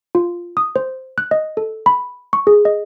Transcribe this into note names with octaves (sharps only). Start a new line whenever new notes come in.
F4
D#6
C5
F#6
D#5
A4
B5
C#6
G#4
D#5